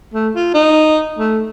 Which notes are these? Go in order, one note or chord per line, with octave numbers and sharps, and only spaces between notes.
A3
F4
D#4
A3